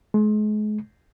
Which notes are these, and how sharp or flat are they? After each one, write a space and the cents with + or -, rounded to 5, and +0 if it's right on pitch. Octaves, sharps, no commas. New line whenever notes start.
G#3 +35